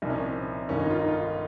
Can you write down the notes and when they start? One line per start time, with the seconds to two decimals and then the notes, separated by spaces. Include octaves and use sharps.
0.02 C2 A#2 F3 D#4
0.10 C#4
0.18 C4
0.26 C#4
0.68 G1 G2 D#3 C#4
0.79 D#4
0.90 F4
0.99 D#4
1.08 F4